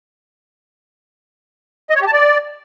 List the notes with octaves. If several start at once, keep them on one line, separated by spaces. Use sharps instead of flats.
D#5
C#5
G4
A5
D5